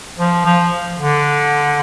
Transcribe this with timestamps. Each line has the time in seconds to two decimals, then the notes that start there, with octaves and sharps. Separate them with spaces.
0.19 F3
0.45 F3
0.98 D3